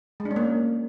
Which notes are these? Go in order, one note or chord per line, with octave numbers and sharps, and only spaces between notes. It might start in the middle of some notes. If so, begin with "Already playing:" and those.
G#3
D4
C#4
A#3